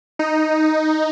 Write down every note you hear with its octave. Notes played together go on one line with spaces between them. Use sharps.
D#4